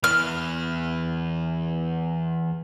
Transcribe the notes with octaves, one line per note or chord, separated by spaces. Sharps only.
E2 E3 F6